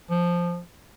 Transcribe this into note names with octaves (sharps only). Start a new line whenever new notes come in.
F3